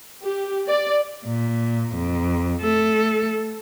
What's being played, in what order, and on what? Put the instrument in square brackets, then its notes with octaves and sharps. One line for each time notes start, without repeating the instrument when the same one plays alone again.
[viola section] G4
D5
[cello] A#2
F2
A3 A4